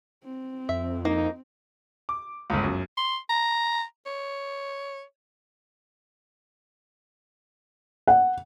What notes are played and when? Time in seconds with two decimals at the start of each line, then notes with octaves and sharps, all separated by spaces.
0.24 C4
0.69 F2 E5
1.05 A#3 D#4
2.09 D6
2.50 G1 C#2
2.64 F#2
2.97 C6
3.30 A#5
4.06 C#5
8.07 F#5